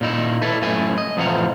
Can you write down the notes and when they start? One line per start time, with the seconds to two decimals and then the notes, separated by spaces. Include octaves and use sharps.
0.01 A#2 D#4 E4
0.42 E4 A4 B4
0.62 F#2 A2 A3 E5 G#5
0.98 D#5
1.17 F2 A2 E3 F3 F#5 A#5